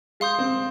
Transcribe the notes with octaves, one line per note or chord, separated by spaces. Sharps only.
G#3 F5 C6 D#6 G6
C4